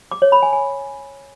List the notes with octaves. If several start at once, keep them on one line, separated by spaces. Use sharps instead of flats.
D6
C#5
B5
G#5
G#5